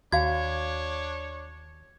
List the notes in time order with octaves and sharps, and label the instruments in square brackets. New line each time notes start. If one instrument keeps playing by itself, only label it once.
[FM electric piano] D#2 [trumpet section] D4 C#5 [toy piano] F#4 F5 [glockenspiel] G#6